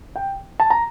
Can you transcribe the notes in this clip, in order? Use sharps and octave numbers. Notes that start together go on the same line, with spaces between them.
G5
A5
A#5